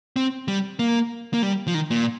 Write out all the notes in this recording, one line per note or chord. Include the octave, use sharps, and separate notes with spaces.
C4
G3
A#3
A#3
G3
F3
D#3
A#2